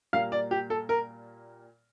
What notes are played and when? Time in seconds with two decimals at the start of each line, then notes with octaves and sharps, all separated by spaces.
0.13 A#2 G3 A#3 F5
0.32 D5
0.51 G4
0.70 A4
0.89 A#4